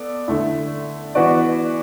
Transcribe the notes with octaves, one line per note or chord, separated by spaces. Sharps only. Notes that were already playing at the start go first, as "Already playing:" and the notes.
Already playing: B3 A4 D5
D3 A3 E4
E3 B3 F#4 B4 D5